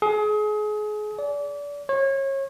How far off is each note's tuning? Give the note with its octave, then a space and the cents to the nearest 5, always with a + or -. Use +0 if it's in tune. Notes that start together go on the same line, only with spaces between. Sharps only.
G#4 +30
D5 -30
C#5 -30